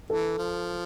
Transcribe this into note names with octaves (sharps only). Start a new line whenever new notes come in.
E3 A4
F3